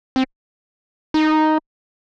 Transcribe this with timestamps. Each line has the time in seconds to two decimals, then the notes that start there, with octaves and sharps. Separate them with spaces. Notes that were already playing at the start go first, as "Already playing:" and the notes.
0.16 C4
1.14 D#4